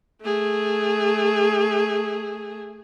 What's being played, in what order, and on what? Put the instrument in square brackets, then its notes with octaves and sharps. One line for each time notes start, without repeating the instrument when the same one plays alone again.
[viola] A3 G#4